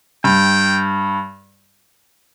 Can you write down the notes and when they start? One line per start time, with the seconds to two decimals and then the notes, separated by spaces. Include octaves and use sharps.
0.24 G2 G5